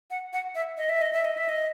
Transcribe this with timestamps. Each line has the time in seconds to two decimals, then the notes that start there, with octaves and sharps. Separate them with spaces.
0.10 F#5
0.33 F#5
0.55 E5
0.77 D#5
0.89 E5
1.02 D#5
1.13 E5
1.25 D#5
1.37 E5
1.49 D#5